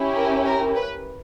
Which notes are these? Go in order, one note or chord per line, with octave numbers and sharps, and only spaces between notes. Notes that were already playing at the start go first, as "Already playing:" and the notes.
Already playing: C#4 E4 G4
A#4
A#4
B4